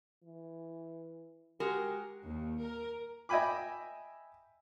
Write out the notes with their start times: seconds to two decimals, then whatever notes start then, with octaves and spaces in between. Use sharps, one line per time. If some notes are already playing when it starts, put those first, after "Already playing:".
0.24 E3
1.60 G#3 F#4 G4 A#4
2.25 D#2
2.62 A#4
3.29 D#5 E5 G5 G#5 B5 D6